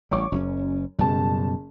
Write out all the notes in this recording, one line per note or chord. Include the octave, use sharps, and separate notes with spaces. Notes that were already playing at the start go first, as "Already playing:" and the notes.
A1 G3 C#5 C#6 D6
F#1 F#2 B2 C#4
F#1 F#2 B2 G3 A5